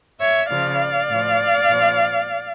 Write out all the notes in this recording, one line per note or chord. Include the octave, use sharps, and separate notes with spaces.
C#5 E5
C#3 F3 D5 F5
A2 F3
A#2 F3